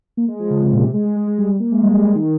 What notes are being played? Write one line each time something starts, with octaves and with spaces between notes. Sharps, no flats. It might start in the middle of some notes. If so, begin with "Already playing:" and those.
A#3
G#3
F3
C#3
C3
A#2
C3
G#3
G#3
G#3
G#3
G3
G3
A#3
G#3
G3
G#3
D#3